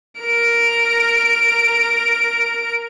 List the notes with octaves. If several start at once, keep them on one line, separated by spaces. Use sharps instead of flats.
A#4 D7